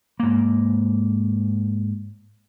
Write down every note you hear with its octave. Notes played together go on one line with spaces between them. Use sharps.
G#2 A#3